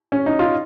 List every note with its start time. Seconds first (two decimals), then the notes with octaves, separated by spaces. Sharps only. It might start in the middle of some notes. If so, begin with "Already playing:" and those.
0.12 C#4
0.26 D#4
0.39 F4